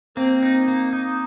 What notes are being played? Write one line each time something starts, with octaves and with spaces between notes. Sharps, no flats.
A#3 C4
D#4
A#3
D#4